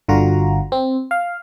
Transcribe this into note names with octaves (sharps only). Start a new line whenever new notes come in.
G1 D3 F4 F#4 A#5
C4
F5